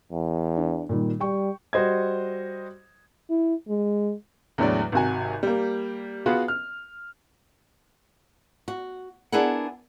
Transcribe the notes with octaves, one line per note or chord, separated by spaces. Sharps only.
E2
D4
A#2 D#3 G3
G3 G5 C#6
G3 F#4 C5 D#5 G#6
E4
G#3
E2 A2 D3 F#3 G#3 D5
G#1 C3 F#4 G#5
G3 A#3
B3 F4 F#4 G#4 B4
F6
F#4
B3 D4 E4 G#4 A#4 F#5